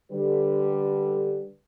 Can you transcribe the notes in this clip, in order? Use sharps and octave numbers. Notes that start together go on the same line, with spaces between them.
D3 G3 B4